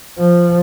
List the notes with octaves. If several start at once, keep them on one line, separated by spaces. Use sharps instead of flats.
F3